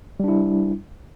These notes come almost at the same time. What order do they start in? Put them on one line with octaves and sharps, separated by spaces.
G3 D4 E4